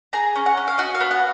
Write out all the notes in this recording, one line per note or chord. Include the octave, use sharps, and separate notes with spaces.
G#4 A#5
C#4
F#5
C#4
F5
F#4 D#5
F5
B3
F#5